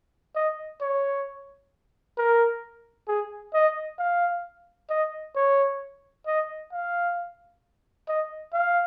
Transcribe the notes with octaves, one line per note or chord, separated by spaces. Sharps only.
D#5
C#5
A#4
G#4
D#5
F5
D#5
C#5
D#5
F5
D#5
F5